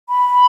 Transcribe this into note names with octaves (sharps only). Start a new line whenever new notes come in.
B5